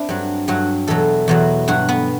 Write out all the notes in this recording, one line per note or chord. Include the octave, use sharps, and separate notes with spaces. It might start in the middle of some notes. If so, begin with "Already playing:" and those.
Already playing: C4 D4 E4
G2 F#3
G2 F#3 F#4
E2 B2 F#3 A4
E2 B2 F#3
G2 F#3 F#4
B3